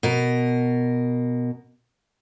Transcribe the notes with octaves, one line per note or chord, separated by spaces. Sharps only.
B2 A#4